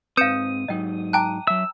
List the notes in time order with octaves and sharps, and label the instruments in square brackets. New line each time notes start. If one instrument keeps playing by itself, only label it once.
[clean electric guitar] G#2 C4 [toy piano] B4 F5 [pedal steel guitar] D#6 [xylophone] G6 C#7 E7
[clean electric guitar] G#2 F#3 D#4 [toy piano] D#5 G5
[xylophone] G5 F#6 [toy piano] A5 A#5 D6
[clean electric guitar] F#3 E5 [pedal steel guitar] E6